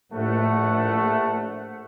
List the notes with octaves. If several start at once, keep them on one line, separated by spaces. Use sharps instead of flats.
A#1 A2 A3 F#5